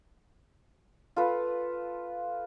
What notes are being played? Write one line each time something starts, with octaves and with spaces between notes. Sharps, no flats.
F4 A4 B4